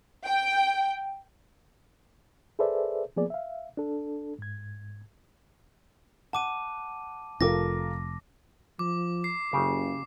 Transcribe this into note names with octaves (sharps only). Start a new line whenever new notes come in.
G5
G#4 A4 B4 C5 D5 E5
F3 A#3 B3 G#4 D5
E5 F5
D4 A4
G#2 G#6
F#5 A5 D6 D#7
F1 F4 A4 A#4 D6 A#6
F3 D6
C7
F#1 C#3 G4